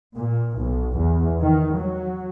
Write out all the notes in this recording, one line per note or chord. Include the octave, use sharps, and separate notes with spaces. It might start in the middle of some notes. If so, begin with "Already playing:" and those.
A#2
B1
E2
D#3
F#3